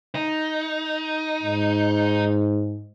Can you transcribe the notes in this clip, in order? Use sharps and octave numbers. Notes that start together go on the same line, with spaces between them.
D#4
G#2